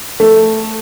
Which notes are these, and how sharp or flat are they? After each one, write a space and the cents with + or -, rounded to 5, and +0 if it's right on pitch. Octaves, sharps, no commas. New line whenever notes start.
A3 +5